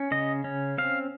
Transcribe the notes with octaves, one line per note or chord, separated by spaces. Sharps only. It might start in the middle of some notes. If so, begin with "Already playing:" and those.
Already playing: C#4
C#3 D#5
C#4
C4 F5